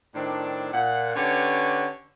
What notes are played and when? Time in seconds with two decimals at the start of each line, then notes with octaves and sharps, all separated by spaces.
0.15 A2 D#3 C4 D4
0.72 A#2 F#5
1.15 D3 C#4 G4 B4 C#5